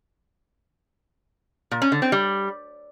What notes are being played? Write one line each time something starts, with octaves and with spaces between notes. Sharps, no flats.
A#2
C#4
D3
C4
G3